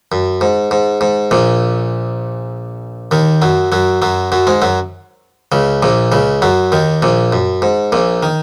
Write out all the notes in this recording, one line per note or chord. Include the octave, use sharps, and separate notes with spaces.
F#2
G#2
G#2
G#2
A#1 A#2
D#2 D#3
F#2 F#3
F#2 F#3
F#2 F#3
F#2 F#3
G#2 G#3
F#2 F#3
C#2 C#3
A#1 A#2
C#2 C#3
F#2 F#3
D#2 D#3
A#1 A#2
F#2
G#2
A#1 A#2
D#3